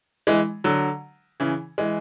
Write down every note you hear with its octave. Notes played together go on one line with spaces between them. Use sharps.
E3 G#3
D3 F#3
C#3 E3
E3 G#3